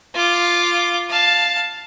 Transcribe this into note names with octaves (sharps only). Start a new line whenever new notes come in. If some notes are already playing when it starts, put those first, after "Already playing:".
F4 D6
F5 A5